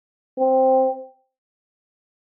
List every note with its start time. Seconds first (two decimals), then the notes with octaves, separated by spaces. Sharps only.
0.39 C4